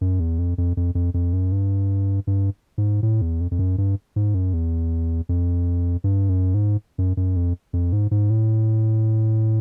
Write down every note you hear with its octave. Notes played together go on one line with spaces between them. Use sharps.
F#2
E2
F2
F2
F2
F2
F2
F#2
G2
G2
G#2
A2
E2
F2
F2
F#2
G2
G#2
F#2
E2
F2
G2
F#2
G#2
F#2
F#2
F2
F2
G#2
G#2
A2